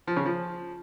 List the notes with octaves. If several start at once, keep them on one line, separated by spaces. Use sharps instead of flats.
F3
C#3
F3